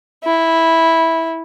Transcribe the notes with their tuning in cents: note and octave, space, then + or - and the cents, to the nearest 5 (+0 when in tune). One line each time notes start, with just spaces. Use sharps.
E4 -10